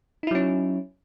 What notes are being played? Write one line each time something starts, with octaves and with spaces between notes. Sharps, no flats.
F#3 C#4 D#4 E4